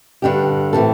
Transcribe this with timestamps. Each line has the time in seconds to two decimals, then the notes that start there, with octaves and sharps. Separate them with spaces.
0.22 G2 D3 G3 D4 G4
0.73 A2 E3 C4 A4